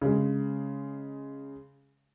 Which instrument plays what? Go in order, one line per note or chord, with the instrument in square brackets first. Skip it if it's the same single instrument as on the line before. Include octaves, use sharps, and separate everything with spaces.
[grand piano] C#3 G#3